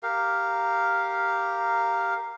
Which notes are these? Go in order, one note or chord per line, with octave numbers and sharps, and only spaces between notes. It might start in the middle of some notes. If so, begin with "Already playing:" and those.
G4 A#4 F5